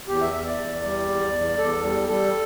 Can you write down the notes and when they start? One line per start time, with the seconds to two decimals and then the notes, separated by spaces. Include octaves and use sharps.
0.08 E2 G4
0.21 E5
0.34 E2 E5
0.46 D5
0.59 E2
0.84 G3
1.08 E2
1.34 E2
1.58 E2 A4
1.84 G3
2.08 G3 A4